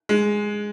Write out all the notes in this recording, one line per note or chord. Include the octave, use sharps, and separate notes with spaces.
G#3